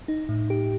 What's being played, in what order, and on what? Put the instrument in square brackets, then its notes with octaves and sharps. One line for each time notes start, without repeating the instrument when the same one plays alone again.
[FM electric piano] D#4
A2
G4